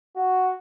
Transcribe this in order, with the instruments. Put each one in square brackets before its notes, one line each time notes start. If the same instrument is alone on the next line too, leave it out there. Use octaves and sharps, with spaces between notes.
[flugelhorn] F#4